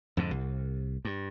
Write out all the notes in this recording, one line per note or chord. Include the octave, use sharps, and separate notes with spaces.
F2 G#2 D3
C2
G2